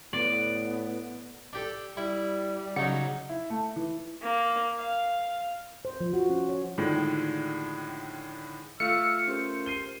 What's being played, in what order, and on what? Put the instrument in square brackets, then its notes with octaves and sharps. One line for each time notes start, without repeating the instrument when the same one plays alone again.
[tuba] A2 [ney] B3 [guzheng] D5
[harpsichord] D4 G4 A4
[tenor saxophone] G3 [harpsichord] E4
[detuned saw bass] C#3 [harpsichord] F#3 D#4 D5 [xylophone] F#5
[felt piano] E4
A3
E3
[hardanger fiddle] A#3
F5
[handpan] C5
F3
F#4
C#4
C#5
[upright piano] A2 D3 D#3 F3 G#3
[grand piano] A3 F4 [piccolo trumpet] E6 [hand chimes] F6 B6 [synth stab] C#7
[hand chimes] C#4 G4 A#4 [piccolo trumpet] C5
[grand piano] C7 D#7 G7